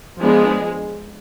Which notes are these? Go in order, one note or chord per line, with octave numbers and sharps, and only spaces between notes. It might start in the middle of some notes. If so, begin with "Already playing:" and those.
F3 G#3 B3 D4 G#4